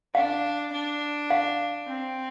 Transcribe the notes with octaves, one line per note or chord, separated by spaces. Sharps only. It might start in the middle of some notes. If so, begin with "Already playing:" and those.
D4 F5
D4
F5
C4